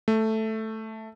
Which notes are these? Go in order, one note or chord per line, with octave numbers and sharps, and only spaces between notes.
A3